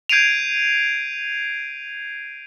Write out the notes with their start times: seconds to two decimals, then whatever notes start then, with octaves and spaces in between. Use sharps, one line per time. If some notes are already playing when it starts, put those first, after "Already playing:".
0.09 G6 G#6 C7 D7 D#7 F7